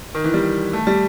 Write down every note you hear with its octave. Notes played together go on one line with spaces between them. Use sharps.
D#3
E3
G3
A3
G3